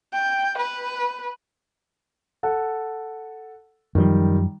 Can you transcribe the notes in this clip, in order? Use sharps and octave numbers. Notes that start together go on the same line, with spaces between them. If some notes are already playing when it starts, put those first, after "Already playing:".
G5
B4
A4 F#5
F#2 D#3 F3 G3